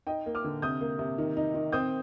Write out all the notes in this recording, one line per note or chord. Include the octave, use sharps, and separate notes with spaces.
D#4 D#5 G5
A#3
D6 F6
D3
C3 D#6 G6
A#3
C3
D#3
D#4
D#3
C4 D#6 G6